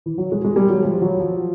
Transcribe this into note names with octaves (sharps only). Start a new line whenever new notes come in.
E3
F#3
G#3
G#3
G3
F#3
F3
F#3
F3